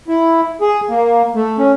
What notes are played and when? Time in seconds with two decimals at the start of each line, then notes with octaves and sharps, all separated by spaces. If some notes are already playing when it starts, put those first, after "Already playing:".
0.08 E4
0.61 G#4
0.89 A#3
1.35 A3
1.59 C#4